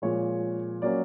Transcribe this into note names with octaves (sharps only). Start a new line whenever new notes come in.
A#2 F3 G#3 C#5
F#3 A#3 C#4 D5